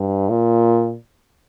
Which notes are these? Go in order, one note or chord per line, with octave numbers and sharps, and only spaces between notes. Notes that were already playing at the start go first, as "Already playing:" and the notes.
Already playing: G2
A#2